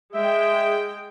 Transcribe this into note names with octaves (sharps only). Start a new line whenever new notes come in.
G#3 E5 G5